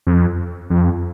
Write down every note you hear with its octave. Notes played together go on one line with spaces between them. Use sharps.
F2
F2